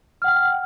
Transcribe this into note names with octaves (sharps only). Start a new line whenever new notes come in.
F#5 G5 F6